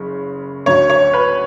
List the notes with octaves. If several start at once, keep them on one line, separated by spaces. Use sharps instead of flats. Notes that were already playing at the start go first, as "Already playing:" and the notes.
Already playing: F#1 C#3
D2 D3 F#3 C#5
C#5
B4